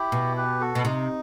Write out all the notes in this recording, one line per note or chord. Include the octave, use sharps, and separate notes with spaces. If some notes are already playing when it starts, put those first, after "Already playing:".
Already playing: E4 G4
B2
G4 B4
F#4 A4
B2
C3 D#4